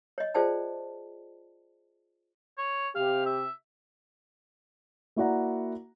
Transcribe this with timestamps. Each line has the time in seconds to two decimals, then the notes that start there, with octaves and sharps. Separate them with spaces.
0.18 C#5 D#5
0.34 F4 G#4 C5 D5 G5 A5
2.58 C#5
2.95 C3 C4 G4 F5
3.26 E5
5.16 A#3 E4 F#4 D5 F#5 A#5